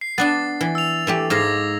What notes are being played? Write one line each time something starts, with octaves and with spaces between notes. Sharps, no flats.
C7
B3 D4 A5 A6
E3
E6 F7
E3 A3 G4
G#2 D#4 F5 D6 G#6 A#6